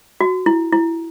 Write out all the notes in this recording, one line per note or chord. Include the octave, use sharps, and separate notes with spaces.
F#4
E4
E4